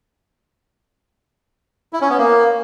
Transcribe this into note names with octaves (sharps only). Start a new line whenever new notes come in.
E4
C#4
B3
A#3